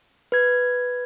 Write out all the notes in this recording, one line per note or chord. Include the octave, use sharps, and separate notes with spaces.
B4 G#6